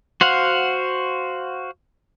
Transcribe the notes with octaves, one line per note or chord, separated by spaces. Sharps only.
F#4 C5 F5 F#5